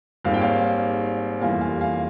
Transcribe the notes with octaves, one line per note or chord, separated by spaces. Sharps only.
G#1 G#2 G3 A#3 F5
G5
C#5 F5
F1 E2 E3 G3 A#3 F5 G#5
F5 G#5
F5 G#5